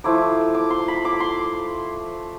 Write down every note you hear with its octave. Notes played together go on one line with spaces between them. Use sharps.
F3 A3 E4 D6
D6
C6
B5
D6
C6